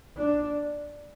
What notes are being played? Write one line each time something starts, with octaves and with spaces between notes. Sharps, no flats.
D4